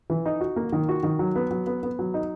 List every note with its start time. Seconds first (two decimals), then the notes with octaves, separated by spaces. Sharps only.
0.10 E3
0.26 D#4
0.40 F#4
0.56 A#3
0.73 D#3
0.89 F#4
1.03 D#3
1.19 F#3
1.36 B3
1.51 F#3
1.67 B3
1.83 B3
1.99 F#3
2.14 D#4